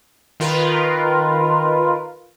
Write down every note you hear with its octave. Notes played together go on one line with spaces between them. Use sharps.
D#3 F4 A#4 B4